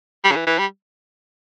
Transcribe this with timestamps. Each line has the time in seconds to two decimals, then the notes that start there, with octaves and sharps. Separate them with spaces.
0.24 G3
0.31 C#3
0.36 E3
0.47 E3
0.59 G3